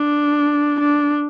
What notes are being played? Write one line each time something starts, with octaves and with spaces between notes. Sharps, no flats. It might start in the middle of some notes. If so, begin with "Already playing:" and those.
Already playing: D4
D4